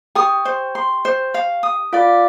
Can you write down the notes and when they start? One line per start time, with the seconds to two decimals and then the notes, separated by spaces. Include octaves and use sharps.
0.15 G4 G5 D#6
0.45 C5
0.75 C6
1.05 C5
1.34 F5
1.63 D#6
1.93 F4 D5 F5